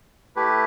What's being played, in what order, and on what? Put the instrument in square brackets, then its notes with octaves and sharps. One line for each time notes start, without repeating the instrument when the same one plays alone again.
[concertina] A3 E4 G4 B4